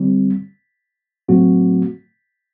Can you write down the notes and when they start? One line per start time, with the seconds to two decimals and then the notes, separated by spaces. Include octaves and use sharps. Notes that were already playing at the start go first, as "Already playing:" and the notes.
Already playing: D3 G3 C4
1.28 A2 F#3 A3 C4 F#4